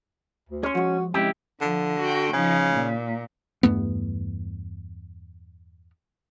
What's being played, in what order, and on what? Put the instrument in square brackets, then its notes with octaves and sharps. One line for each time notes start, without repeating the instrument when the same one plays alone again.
[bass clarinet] D2
[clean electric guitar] C#4 [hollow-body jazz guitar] G#4 C6
[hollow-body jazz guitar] F3 G#3 [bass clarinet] F#4
[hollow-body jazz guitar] F2 C#3 [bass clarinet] G#3 [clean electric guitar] E4 G4
[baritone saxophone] D3 [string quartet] F3
[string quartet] F#4 G5
[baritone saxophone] C#3 [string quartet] F3 D#4
[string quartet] A#2
[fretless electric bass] E2 G2 A3 B3